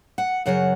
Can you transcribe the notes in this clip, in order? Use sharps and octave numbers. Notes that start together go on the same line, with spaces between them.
F#5
F#2 C#3 F#3 F#5